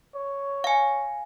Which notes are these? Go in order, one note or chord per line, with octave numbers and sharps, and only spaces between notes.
C#5
F5 G#5